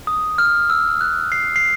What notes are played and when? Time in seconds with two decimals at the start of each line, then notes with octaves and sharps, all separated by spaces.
0.07 D#6
0.38 F6
0.70 E6
1.01 F#6
1.32 C7
1.56 C7